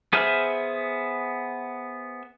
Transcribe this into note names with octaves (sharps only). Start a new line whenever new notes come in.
B3 G#4 C5 E5 F6